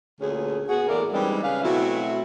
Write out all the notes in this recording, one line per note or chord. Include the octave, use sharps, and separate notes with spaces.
D2 A#2 C#4 G#4
B3 F#4 G#4
E2 A2 A3 A#3 A#4 D5
E3 G3 G#3 C4 D4 D#4
C#3 G#4 B4 F5
B2 F#3 A3 C4 E4